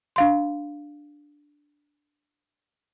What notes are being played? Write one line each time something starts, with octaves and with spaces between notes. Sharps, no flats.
D4 F5 C6